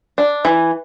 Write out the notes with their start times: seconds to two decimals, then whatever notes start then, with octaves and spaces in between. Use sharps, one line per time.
0.18 D4
0.45 E3